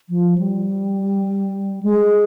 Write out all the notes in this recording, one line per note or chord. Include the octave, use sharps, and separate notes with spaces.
F3
G3
G#3